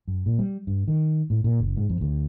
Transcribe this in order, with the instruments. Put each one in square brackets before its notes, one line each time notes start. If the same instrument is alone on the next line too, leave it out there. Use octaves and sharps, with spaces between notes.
[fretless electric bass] F#2
A#2
G3
G2
D#3
A2
A#2
F#1
G#2
F2
D2